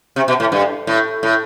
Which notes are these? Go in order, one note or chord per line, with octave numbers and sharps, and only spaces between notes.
C3
B2
A2
G2
A2
A2